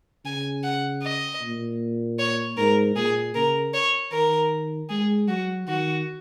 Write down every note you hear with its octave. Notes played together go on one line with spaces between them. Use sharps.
C#3 G#5
F#5
D#5
A#2
C#5
G#2 A#4
A#2 G#4
C#3 A#4
C#5
D#3 A#4
G#3 G#4
F#3 F#4
D#3 F#4